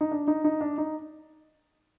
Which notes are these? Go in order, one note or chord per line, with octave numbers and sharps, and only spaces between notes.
D#4
D4
D#4
D#4
D4
D#4